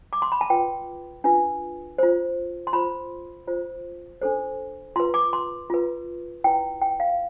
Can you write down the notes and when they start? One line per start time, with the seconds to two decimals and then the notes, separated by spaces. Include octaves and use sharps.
0.13 D6
0.22 C6
0.32 B5
0.41 A5
0.50 F4 B4 G5
1.24 D4 F4 B4
1.98 F4 C5
2.67 C6
2.73 F4 C5 B5
3.47 F4 C5
4.22 D4 A4 C5
4.96 F4 B4 C6
5.14 D6
5.33 C6
5.70 F4 B4
6.44 E4 B4 G5
6.82 G5
7.00 F5